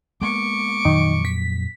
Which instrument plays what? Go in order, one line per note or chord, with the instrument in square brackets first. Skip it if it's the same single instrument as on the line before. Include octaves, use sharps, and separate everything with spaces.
[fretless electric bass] G#3 A#3 B3 [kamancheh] C#6 D6
[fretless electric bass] F2 A#2 F#3 [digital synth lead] D#3
[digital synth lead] B6